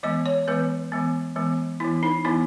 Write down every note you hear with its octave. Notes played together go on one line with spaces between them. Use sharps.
E3 G#3 B3 D#5
C#5
E3 G#3 B3 B4
E3 G#3 B3
E3 G#3 B3
E3 B3 E4
D#4
E3 B3 E4